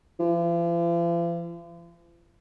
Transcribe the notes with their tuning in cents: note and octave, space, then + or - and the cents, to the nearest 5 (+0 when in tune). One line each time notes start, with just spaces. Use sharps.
F3 -45